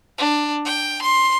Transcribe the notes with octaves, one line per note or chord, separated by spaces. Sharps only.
D4
G5
C6